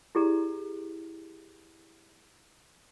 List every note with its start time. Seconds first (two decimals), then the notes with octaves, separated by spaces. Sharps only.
0.15 E4 G4 G#4 D5 A#5